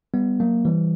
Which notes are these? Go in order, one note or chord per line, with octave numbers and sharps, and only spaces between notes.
G3 B3
F#3 A#3
E3 G3